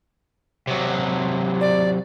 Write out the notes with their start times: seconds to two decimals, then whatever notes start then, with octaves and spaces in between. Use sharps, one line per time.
0.67 C3 F#3
1.61 D5